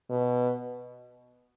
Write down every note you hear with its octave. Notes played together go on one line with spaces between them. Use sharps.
B2